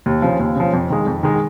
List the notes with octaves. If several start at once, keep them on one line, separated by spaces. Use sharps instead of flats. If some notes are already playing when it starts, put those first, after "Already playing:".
D#2
C#3 F3
D#2
C#3 F3
F2
D#3 G#3
F2
D#3 G#3